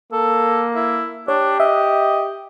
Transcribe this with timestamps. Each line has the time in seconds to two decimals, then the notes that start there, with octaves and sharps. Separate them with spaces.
0.13 A#3 A4
0.75 E4
1.28 D4 G4 C#5
1.60 D#5 E5